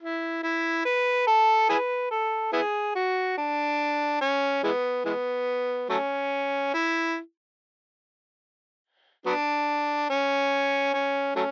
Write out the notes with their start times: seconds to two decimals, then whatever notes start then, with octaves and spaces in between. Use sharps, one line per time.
0.01 E4
0.43 E4
0.85 B4
1.27 A4
1.69 E4 G#4 B4
2.11 A4
2.53 B3 E4 G#4
2.96 F#4
3.38 D4
4.21 C#4
4.64 E3 G#3 B3
5.05 E3 G#3 B3
5.90 F#3 A3 C#4
6.74 E4
9.26 F#3 B3 D4
10.10 C#4
10.94 C#4
11.36 F#3 A3 C#4